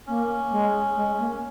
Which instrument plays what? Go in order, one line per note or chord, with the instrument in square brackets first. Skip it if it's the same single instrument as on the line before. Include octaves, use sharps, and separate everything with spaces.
[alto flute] A#3 [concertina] C#4
[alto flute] G#3
G#3
A#3